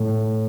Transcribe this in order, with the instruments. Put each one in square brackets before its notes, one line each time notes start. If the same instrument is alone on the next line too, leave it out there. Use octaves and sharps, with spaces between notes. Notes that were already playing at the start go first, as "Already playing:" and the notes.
Already playing: [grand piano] A2